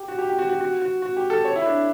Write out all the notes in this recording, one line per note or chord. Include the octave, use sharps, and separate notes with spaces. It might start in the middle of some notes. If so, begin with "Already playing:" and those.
Already playing: G4
F#4
G4
G4
F#4
F#4
F#4
F#4
F#4
G4
A4
C#5
E4
D4